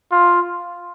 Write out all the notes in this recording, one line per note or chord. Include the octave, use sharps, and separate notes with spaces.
F4